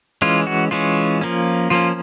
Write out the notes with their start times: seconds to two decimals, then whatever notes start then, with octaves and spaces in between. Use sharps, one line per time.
0.22 E3 G#3 C#4 F4
0.47 F#4
0.71 E3 G#3 C#4 F4
1.21 F3 A#3 C#4
1.70 F3 A#3 C#4 F4